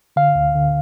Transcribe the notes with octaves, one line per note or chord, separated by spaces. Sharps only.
D3 F5
D2
D3